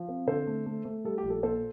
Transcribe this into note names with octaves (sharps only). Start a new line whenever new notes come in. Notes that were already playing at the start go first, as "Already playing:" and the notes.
Already playing: F3
C4
D3 A4 C5
A3
A3
A3
G3 A4
G4
A#1
A4
A#2 A4 C5